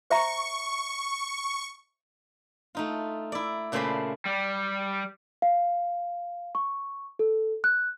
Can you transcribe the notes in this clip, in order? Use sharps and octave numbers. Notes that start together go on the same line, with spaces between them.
C5 E5 A#5 C#6
A3 D#4 F4
E4 D5
A#2 C#3 A3 C5 D5 B5
G3
F5
C#6
A4
F#6